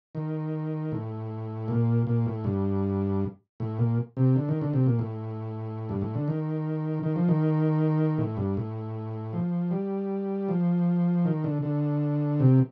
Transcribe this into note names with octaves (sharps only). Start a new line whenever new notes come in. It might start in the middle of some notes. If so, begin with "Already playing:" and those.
D#3
A2
A#2
A#2
A2
G2
A2
A#2
C3
D3
D#3
D3
C3
A#2
A2
G2
A2
D3
D#3
D#3
F3
D#3
A2
G2
A2
F3
G3
F3
D#3
D3
D3
C3